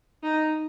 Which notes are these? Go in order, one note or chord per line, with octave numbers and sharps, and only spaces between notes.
D#4